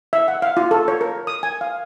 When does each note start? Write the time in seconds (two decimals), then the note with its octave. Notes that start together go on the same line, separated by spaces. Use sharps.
0.13 E5
0.28 F#5
0.42 F5
0.57 F4
0.71 A4
0.88 C#5
1.01 A#4
1.27 D#6
1.43 G#5
1.61 F5